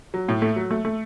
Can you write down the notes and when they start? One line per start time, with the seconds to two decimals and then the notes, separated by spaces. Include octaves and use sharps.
0.14 F#3
0.28 A2
0.42 A3
0.56 F#3
0.71 A3
0.85 A3